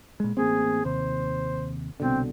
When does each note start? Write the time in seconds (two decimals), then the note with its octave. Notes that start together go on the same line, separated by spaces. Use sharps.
0.20 A#2 G#3
0.37 A1 A#3 C4 G#4
0.85 D#2 C3 C5
2.00 C2 B2 D3 C4